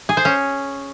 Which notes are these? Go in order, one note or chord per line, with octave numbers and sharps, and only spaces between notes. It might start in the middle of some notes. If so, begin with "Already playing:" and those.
G#4
C5
C#4